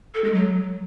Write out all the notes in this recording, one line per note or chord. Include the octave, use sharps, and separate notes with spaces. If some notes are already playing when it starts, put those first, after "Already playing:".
A4
G#3
F#3